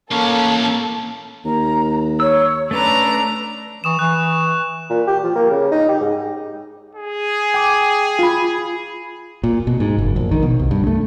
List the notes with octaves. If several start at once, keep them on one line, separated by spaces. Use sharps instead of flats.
A2 A#3 C#4 A4
D#2 A#5
C#5 E6
A3 C#4 D4 A4 B4 A#5
E3 C#6 D#6 E7
E3 F#6
A#2
G4
F3
A#3
C#3
D#4
G4
G#2
G#4
G5 D6
F4 B5
A#2
B2
G#2
F#1
A#1
D#3
B2
C2
G2
A3